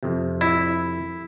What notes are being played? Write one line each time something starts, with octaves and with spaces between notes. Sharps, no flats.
F2 C3
E4